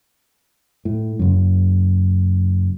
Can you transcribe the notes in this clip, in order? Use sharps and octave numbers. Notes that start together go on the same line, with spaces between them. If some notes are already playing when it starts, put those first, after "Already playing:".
A2
F#1 F#2